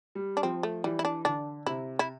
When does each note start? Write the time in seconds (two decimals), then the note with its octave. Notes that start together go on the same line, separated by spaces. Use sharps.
0.15 G3
0.37 D4
0.43 F3 C4
0.63 A3
0.84 E3 G3
0.99 E4
1.05 D4
1.25 D3 D4
1.66 C3 E4
1.99 E4